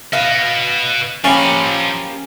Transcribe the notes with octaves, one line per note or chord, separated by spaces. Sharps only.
B4 D#5 F5
F3 A#3 C#4 G4 B5